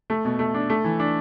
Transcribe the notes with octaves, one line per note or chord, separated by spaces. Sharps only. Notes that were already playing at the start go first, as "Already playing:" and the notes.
A3
B2
A3
D4
A3
E3
D4